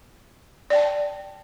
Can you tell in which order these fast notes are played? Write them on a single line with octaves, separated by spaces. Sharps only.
D5 G5 A5